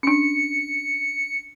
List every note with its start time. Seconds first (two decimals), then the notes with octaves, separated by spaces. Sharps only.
0.03 C#4 D4 C#7